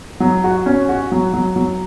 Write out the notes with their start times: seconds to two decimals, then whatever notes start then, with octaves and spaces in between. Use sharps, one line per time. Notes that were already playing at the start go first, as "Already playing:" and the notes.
0.20 F#3
0.44 F#4
0.66 C#4
0.89 F#4
1.12 F#3
1.34 F#3
1.56 F#3